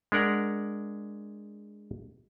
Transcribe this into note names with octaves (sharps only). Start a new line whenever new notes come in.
G#3 D4 A#4 F#5